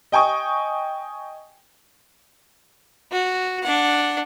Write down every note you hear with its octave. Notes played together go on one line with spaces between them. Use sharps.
D#5 G5 G#5 C#6 D#6
F#4
D4 F#5